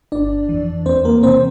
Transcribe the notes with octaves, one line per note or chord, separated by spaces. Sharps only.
G1 D4 D5
F2 E3
E2 C4 C5
A#3 A#4
C3 E3 C4 C5